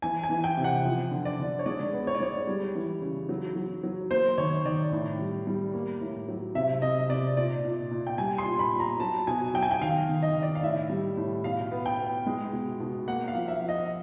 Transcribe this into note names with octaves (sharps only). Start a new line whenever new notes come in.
E3 G#5
G#5
E3
G5
C3
F#5
F3
D3
D5
D3
C#5
G#3 D5
B3
C#5
D5
G#3 C#5
G3
E3
C#3
F#3
F#3
F#3
A#3 C5
D#3 C#5
D#3 D5
A2
G3
G3
A#3
A2
F#3
C3 E5
C3 D#5
C3 D5
A#2 D5
A#2
A#2
G5
G3 G#5
C6
A#2
B5
A#2
A#5
F#3 A5
B2 G#5
F#3 G5
G#5
G5
D#3 F5
D#3
D#5
D#3
D5
F5
A2 E5
G3
A2
B2 F5
B3
G5
B3
G#3
B2
B2
A#3 F#5
F5
F3
E5
F3
D#5